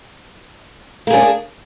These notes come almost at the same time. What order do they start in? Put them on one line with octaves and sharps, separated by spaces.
A#3 G#4 D4